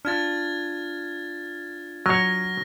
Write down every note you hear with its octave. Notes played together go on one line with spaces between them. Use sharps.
D4 F4 F6 G#6 A6
F#3 C#5 F6 A#6